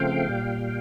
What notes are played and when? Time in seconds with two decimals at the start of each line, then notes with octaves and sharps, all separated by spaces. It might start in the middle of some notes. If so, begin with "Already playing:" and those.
Already playing: C#3 F3 A3 C4 F5 G5
0.29 A#2 G3